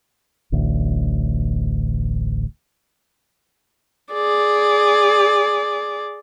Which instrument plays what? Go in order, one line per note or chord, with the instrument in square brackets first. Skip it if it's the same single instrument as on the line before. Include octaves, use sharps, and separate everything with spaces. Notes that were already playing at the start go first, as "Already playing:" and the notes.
[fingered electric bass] D1 A1 D2
[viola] G#4 D5